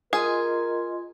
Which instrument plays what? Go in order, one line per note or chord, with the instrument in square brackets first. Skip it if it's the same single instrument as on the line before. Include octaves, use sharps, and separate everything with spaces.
[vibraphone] F4 D#5 C6 [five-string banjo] G#4 [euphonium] A#4